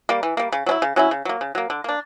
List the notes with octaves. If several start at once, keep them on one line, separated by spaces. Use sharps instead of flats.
G3 A#3
E3
G3 A#3
C#3
F#3 C#4 E4
C#3
F#3 C#4 E4
C#3
F#3 A#3
C#3
F#3 A#3
D3
A#3 D4